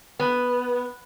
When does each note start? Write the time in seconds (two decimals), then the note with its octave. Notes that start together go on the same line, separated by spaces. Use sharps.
0.19 B3